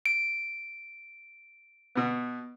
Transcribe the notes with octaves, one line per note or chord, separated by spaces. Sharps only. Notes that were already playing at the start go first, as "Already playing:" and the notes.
D7
B2 B3